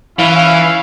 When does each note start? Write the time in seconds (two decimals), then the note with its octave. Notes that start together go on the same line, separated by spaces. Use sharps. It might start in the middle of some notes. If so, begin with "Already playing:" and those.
0.19 E3 C#4 E4 F5